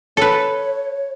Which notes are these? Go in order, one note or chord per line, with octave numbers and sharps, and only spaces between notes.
A4 B4 C#5